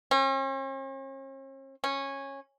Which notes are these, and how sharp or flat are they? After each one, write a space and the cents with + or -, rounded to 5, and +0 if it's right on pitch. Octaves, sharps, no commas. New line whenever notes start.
C#4 -45
C#4 -15